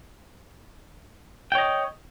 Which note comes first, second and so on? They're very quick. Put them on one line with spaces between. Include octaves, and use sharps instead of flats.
G5 C#5 D#5